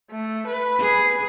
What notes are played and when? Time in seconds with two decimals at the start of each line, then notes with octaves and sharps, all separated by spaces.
0.11 A3
0.47 B4
0.80 G#4